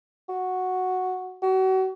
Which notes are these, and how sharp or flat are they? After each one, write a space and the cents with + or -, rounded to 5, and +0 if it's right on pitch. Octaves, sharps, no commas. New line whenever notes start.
F#4 -5
F#4 +35